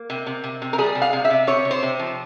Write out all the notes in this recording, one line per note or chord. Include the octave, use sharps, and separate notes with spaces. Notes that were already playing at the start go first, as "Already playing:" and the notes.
Already playing: A#3
C3
C3
C3
C3
A#4
G3 G#4
C3
F5
C3
E5
C3
C3 C#5
C3
C5
C3
F3